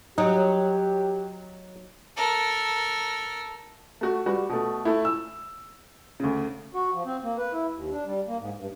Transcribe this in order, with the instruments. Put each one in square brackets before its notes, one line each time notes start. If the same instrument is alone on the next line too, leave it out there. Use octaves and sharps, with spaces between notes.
[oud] F#3 [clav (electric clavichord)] D#4 [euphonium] G4
[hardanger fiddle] A4 A#4
[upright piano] A3 F#4
G3 F#4 B4
B2 A3
A3 E4
E6
D2 C#3
[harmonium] F#4
F3
C4
A#3
B4
E4
D#2
D4
G3
A#3
G#2
G2